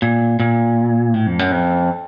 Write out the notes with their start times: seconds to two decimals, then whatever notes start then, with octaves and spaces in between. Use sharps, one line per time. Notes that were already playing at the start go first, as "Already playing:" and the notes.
0.02 A#2
0.40 A#2
1.14 A2
1.27 F2
1.39 F#2
1.52 F2